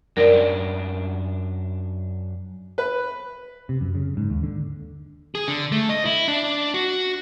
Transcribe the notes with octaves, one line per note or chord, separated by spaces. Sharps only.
F#2 D4 A#4 D5
B4
C3
F#2
C#3
G#2
D#2
D3
G#4
D3
A3
D#5
E4
D4
F#4